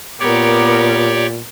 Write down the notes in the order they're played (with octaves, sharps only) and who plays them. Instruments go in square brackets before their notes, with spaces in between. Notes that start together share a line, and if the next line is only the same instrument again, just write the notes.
[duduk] A#2 [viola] B3 A#4 [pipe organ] G4 C#5 D5